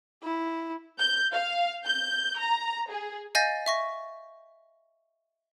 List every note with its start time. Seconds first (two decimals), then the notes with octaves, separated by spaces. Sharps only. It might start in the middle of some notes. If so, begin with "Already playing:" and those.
0.23 E4
0.99 G6
1.32 F5
1.85 G6
2.38 A#5
2.91 G#4
3.35 D#5 F5 G#5 G6 A6 A#6
3.66 E5 C#6 A#6